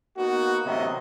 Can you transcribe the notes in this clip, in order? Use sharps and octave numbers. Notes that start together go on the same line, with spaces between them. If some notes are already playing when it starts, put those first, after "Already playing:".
A#3 B3 D#4 F#4
A1 C3 F#3 B3 D#4 D#5